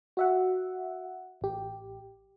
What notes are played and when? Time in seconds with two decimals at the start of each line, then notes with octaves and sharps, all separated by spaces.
0.17 F#4 E5 F#5
1.41 A1 G4